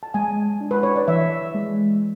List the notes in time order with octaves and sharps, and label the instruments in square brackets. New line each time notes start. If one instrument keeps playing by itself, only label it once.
[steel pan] A5
[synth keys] G#3 [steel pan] G#5
[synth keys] D4
[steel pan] B4
C#5
D5
[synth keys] E3 [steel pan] E5
[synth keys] G#3